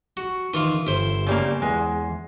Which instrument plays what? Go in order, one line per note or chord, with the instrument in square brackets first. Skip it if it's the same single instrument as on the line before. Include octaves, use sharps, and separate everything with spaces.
[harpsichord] F#4
[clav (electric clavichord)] D#3 [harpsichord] E3 F4 F5
[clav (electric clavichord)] G1 [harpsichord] E4 C5
[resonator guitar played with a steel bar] C#3 G3 A#3
[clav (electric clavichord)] E2 [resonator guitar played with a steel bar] G#3